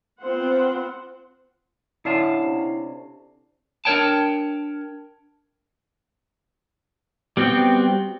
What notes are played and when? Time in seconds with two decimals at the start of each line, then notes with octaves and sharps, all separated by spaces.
0.21 B3 C4 F4 C5 F#5
2.05 D3 C#4 D4 E4 F5 A5
2.42 C3
3.85 D4 A#4 C5 C#5 G5 A5
7.37 G3 B3 C4 F#4 G5